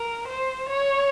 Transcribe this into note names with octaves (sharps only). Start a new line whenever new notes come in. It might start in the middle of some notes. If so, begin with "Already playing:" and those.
Already playing: A#4
C5
C#5